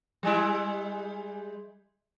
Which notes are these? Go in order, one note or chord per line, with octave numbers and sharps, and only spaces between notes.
G3 G#3 E4